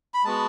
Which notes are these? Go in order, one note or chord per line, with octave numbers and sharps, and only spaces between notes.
B5
G#3 B3 F#4 A5